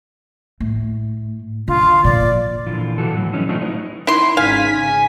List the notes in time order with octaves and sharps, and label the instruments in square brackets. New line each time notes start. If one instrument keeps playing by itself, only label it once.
[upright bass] A2
[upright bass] D3 [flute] F4
[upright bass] A#2 F3 [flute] D5
[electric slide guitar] A#2 D3 E3 F3 F4
B2 E3 F#4 A4
A2 F#3
D3 E3 G3 C#4 D#4
F#3 A3 C4 D4 D#4 F4
D#4 E4 B4 C#5 D#5
[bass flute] D#4 [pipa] E4 C6
[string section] G#1 C#3 B6 [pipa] F5 [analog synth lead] G#5